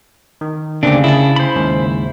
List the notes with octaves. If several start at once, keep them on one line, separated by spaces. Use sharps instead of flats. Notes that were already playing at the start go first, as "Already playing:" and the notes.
D#3
D2 C#3 A#3 C4 D4 G4
E4 G#4 A5
C5 B5
D#2 G#2 C#3